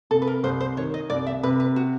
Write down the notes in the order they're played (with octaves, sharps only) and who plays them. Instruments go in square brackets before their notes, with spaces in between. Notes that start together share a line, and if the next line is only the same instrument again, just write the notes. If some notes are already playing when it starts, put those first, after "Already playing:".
[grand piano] C3 [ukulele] A4
[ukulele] B4
A#4
[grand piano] C2 [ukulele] C5
[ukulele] C5
[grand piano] D#3 [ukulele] C#5
[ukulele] D#5
[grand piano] C2 [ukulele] D5
[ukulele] E5
[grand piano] C3 [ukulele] B4
[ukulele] B4
F#4